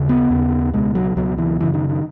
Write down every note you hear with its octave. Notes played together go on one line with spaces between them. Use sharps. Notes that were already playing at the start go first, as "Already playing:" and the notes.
Already playing: D#2 C#3
B3
D#2 C#3
C#2 B2 G#3
F#3
C#2 B2 F#3
E3
F#2 C#3 E3
D#3
D#3